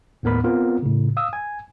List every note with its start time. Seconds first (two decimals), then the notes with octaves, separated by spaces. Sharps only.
0.23 D#2 A2 B3 A#4 B5
0.44 B3 C4 F4 A#4
0.83 A2 C#3
1.17 F5 D#6 E6
1.33 G#5